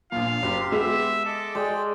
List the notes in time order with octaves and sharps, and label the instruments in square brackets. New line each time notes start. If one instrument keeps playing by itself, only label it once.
[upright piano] A#1 A#2 [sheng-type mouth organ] F4 [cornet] F5
[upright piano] F#1 [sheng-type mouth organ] G4 C6
[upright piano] G#3 B3 [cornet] E5
[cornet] A4 [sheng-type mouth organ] D#5 D6
[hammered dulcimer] G#3 [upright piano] G#4 [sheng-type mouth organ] D5 G5